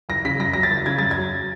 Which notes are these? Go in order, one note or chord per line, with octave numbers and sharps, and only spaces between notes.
F#1 A#6
C#3 B6
F#2 A#6
F#3 A#6
A6
F#1
C#3 G#6
F#2 A6
G#6
F#3